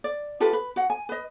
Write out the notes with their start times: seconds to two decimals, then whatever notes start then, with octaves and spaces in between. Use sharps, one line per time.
0.04 D5
0.40 F4 G4 A4 B4
0.53 B4
0.76 F#4 F#5
0.90 G#5
1.09 B4 D#5